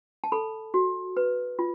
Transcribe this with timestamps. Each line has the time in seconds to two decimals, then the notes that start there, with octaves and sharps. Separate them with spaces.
0.24 A5
0.32 A4 B5
0.74 F#4
1.17 B4
1.59 F4